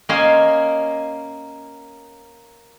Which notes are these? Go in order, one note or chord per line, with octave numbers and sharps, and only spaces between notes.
A#3 C#4 D#5 F5 G#5 C6